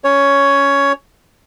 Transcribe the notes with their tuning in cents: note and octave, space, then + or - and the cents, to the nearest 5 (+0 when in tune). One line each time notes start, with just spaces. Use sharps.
C#4 +10 C#5 +10